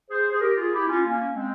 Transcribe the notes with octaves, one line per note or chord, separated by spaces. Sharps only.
G#4 C5
G#4
G4 A#4
F4 G#4
E4 G4
C#4 F4
A#3 C#4
G#3 C4